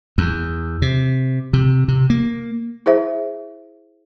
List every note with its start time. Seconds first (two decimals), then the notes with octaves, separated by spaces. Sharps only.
0.18 E2
0.82 C3
1.53 C3
1.88 C3
2.10 A#3
2.86 E4 G#4 C5 E5